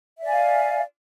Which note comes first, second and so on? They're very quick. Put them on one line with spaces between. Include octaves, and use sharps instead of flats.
E5 D5 G#5 F5